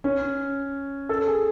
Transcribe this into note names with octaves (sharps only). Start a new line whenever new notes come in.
C#4
A4
G#4